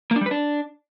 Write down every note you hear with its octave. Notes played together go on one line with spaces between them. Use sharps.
A#3
D4
G3
B4
D4